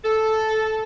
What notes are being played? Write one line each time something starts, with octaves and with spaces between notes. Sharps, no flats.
A4